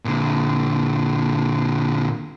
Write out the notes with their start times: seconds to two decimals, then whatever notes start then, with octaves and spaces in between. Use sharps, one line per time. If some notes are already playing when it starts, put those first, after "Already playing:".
0.05 A#2 D3